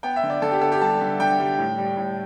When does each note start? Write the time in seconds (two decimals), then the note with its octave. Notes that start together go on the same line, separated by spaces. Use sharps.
0.03 B3 G5
0.16 E5
0.23 D3
0.30 D5
0.42 D3 A4
0.51 G4
0.61 B3 A4
0.72 G4
0.81 G3 A5
1.01 D3
1.20 D3 G5
1.40 G3
1.59 A2
1.78 G3
1.97 A2